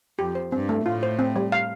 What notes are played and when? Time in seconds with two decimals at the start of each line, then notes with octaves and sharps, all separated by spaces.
0.19 F2 G4
0.35 C5
0.52 G2 C4
0.69 A3
0.85 A2 F4
1.03 C5
1.19 C4
1.36 G3
1.52 F5